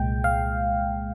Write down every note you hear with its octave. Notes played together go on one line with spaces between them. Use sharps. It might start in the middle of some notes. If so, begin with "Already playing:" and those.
Already playing: C2 A#2 G#3 G5
F5